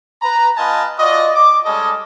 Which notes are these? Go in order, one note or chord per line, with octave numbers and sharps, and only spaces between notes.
B4 A#5
B3 F4 B4 D#5 G#5 A5
F4 F#4 D5 D#5
D6
G3 G#3 C#4 A4 D#5